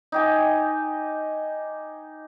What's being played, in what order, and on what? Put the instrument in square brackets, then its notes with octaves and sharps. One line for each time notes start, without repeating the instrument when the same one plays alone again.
[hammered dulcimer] D#4 G4 G#5